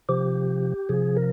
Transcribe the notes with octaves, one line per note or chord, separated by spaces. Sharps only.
C3 F3 G4
C3 F3 G#4
A#4